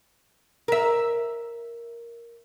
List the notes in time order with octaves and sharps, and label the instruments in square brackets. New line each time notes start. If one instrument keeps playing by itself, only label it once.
[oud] A#4 E5